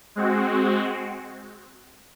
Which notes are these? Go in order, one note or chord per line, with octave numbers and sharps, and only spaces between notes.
G#3 C4 F#4